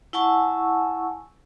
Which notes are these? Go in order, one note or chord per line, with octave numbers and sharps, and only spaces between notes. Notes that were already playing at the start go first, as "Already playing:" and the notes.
E4 F#5 G#5 A5 C#6 E6